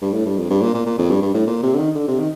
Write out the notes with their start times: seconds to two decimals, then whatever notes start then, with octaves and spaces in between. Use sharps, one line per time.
0.02 G2
0.13 A2
0.26 G2
0.37 F2
0.50 G2
0.62 A#2
0.74 A#2
0.86 A#2
0.98 F2
1.10 G2
1.22 G2
1.34 A2
1.47 A#2
1.63 C3
1.74 D3
1.79 D#3
1.95 D3
2.08 C3
2.19 D#3